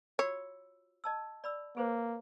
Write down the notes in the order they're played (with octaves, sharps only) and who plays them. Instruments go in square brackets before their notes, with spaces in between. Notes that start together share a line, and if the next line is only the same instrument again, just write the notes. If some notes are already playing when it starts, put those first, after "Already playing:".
[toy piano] F4 F#4 E6 [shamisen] C#5
[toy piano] D#5 A5 E6
D5 B5 E6
[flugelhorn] A#3 [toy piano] G#4 B4 C5